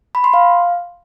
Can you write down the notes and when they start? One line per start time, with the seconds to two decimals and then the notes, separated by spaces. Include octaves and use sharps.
0.15 B5
0.24 C6
0.34 F5